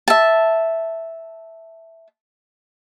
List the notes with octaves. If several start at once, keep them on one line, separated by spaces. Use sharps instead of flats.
E5 A5